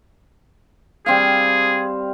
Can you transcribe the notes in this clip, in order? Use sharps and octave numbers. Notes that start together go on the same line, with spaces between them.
G3 C4 G#4 F5